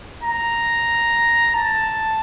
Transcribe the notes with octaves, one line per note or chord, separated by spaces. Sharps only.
A#5
A5